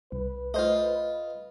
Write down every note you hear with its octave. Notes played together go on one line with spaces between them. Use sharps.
C2 B4
A3 F4 C5 D#5